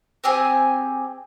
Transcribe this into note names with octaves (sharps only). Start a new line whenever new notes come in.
C4 G4 G#4 G#5